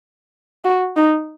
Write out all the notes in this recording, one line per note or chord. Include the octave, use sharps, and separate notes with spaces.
F#4
D#4